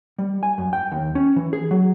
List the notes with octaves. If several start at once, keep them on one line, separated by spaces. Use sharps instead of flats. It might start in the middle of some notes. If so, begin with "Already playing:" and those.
G3
G#5
F#2
G5
D#2
C#4
E3
G#4
F#3